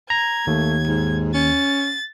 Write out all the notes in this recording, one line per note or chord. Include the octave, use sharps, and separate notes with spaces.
A#5 G#6
D#2 A3
G#2
C#4 A6